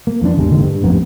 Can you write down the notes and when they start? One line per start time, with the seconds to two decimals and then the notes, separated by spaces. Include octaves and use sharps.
0.07 A#3
0.22 F2 E3 D4
0.37 G#1 E2 G3 G#3
0.49 G#1 A#2 D3 D#3
0.63 G2
0.83 A1 F2 A#3 B3